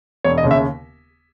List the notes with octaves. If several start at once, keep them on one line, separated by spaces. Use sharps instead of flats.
E1 C#5
D#5
D#2 C#3
E5